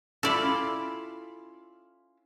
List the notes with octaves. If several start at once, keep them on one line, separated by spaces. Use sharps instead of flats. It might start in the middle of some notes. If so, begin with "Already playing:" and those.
C#4 E4 F4 A4 D5